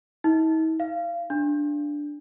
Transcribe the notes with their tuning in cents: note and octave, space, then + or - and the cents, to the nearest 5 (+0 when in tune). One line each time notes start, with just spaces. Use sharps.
D#4 +45
F5 -25
D4 +0